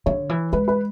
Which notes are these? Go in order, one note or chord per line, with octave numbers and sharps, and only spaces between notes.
D3 C#5
E3
G#3 B4
B4